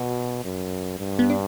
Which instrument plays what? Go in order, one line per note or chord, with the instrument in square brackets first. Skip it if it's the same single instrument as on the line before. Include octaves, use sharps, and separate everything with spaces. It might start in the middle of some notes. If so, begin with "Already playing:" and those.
Already playing: [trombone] B2 [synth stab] F#4
[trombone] F#2
G2
[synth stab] B3
D4